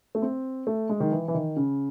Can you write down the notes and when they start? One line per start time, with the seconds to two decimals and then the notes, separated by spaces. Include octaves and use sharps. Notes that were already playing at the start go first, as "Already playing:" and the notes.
0.15 A3
0.22 C4
0.67 A3
0.89 G#3
1.00 D#3
1.12 E3
1.28 E3
1.34 D#3
1.56 C#3